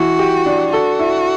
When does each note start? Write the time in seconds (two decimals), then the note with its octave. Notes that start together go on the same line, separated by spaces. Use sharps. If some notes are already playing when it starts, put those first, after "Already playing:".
Already playing: E3 F#4
0.19 G4
0.46 D4
0.72 F#4 A4
0.99 E4